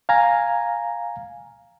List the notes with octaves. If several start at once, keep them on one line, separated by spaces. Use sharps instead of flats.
F5 G#5 A#5